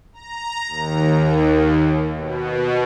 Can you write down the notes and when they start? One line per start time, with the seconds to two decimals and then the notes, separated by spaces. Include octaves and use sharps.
0.13 A#5
0.67 D#2
2.15 B2